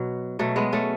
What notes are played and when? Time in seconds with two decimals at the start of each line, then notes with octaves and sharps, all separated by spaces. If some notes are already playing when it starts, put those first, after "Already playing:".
Already playing: B2 F#3
0.39 B2 F#3 A3
0.56 G#3 B3
0.72 A3 C#4